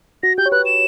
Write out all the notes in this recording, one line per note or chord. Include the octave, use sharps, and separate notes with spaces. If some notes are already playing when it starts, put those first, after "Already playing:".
F#4 A#6
G4 G6
C#5
B4 F#6
E7